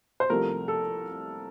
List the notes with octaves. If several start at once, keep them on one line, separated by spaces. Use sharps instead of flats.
C5
C2 C3 F3 A3 A#4
A4